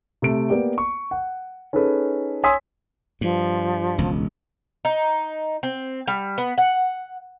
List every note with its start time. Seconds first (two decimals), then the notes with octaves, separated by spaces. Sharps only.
0.22 C3 A3 D7
0.50 A#3 B3 G4 D5
0.78 C#6
1.11 F#5
1.73 C#4 D#4 G#4 A4 B4
2.43 C#5 G#5 C6 D#6 E6 B6
3.21 G2 F3
3.98 E1 C#2
4.85 D#4
5.63 C4
6.08 G3
6.38 B3
6.58 F#5